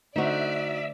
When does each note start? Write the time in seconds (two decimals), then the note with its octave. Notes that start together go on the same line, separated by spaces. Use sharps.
0.16 D3 A3 D#4 F#4 C5 D5 E5